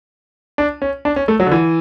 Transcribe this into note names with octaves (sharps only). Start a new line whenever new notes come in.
D4
C#4
D4
C#4
A3
F#3
D3
E3